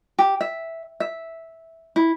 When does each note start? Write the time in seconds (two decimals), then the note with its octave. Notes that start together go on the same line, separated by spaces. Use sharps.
0.19 G4
0.41 E5
1.00 E5
1.96 E4